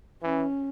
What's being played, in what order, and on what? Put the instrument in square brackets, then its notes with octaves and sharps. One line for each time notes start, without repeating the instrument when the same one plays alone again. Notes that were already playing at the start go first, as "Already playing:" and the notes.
[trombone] E3 [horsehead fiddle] C#4